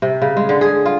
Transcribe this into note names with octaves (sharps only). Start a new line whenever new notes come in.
C3
C#3
G#3
D3
G#4
F4